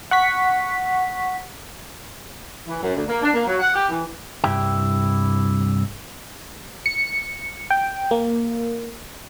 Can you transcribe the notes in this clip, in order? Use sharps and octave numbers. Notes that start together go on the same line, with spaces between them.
F#5 C#6 B6
E3
F#2
D2
A#3
D4
A#3
F#3
F#5
G4
E3
C2 G2 E4 G4 G5
C#7
G5
A#3